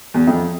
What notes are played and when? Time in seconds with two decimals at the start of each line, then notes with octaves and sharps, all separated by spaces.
0.14 E2
0.27 F2